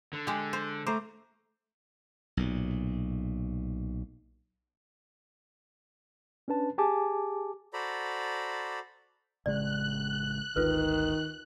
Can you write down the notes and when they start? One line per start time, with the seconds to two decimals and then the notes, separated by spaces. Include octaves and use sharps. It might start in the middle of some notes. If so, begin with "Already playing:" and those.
0.13 D3
0.27 G#3 G4
0.53 C5
0.87 A3 C5 A#5 D6
2.37 B1 A#2
6.48 C#4 D4 B4 A5
6.78 G4 G#4 G#5 A5 D6
7.73 F#4 A4 C5 D5 A#5 B5
9.46 A1 C#3 G#3 D5 F#6
10.56 G#1 D2 D#3 F4 A4 B4